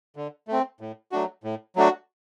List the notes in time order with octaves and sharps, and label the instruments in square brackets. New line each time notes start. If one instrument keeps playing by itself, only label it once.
[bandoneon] D3
A3 C4
A2
F#3 A3 D4 F#4
A2
F#3 A3 D4 F#4